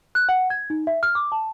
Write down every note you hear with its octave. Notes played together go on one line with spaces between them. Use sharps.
F#6
F#5
G#6
D#4
E5
F6
D6
A5